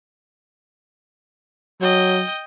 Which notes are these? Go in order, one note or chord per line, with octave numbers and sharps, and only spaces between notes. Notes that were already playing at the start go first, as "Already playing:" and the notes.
F#3 D#5 G5